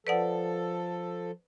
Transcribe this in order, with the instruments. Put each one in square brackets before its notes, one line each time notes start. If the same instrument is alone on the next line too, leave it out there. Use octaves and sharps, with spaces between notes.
[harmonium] F3 A4 [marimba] B4 D5 F#5